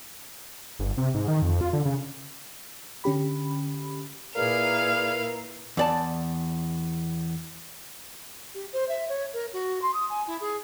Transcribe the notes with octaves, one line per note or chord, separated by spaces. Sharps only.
G1
C3
G#2
D#3
F2
F4
D3
C#3
D3 C#4 G4 B5
A#2 E4 G#4 A#4 B4 D5 F5 F6
E2 D5 A5
G4
C5
E5
C#5
A#4
F#4
C6
D#6
G#5
E4
G#4